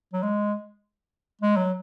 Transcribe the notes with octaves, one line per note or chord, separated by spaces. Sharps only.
F#3
G#3
G#3
F#3